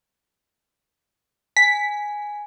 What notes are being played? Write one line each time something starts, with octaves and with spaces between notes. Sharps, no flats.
G#5 B6